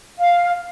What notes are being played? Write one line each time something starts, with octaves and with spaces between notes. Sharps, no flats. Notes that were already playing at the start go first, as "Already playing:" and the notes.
F5